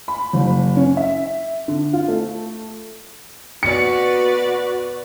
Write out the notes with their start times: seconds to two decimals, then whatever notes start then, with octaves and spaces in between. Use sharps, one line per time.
0.08 B5
0.33 F#1
0.77 C#4
0.97 E5
1.68 D3
1.93 F4
2.08 A3
3.63 B2 F#4 B4 D5 C#7